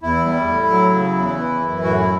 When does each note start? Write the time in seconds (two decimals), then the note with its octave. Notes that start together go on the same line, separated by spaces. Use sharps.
0.03 E2 E4
0.25 G3
0.48 A2
0.70 F#3
0.93 C#3
1.16 E2
1.37 E3
1.61 F#2
1.83 A2 F#4
1.98 E4